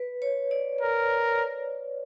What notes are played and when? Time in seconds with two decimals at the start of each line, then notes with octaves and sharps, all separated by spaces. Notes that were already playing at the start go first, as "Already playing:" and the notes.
Already playing: B4
0.22 C#5
0.51 D5
0.81 A#4